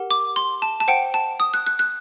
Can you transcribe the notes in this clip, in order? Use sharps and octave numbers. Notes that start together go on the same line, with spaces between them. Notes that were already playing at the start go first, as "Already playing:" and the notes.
Already playing: G4 A#4 F#5
D6
C6
A5
A5
C5 F#5 G5
A5
D#6
F#6
F#6
F#6